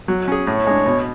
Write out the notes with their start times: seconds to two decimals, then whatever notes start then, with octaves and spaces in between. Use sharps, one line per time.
0.08 F#3
0.28 C#4 G#4
0.47 A2 C#5
0.67 G#3 D4
0.86 B2